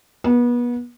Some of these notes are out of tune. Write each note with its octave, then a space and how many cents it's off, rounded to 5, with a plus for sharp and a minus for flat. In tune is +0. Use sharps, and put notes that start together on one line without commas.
B3 -30